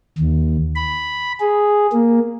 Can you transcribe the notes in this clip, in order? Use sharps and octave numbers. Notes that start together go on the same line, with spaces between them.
D#2
B5
G#4
A#3